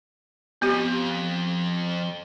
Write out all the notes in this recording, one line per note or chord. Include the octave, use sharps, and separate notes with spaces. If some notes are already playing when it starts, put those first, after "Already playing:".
F2 B3 G4